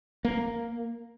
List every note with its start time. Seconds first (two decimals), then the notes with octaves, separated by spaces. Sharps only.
0.25 A#3